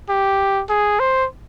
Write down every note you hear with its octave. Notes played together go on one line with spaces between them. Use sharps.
G4
G#4
C5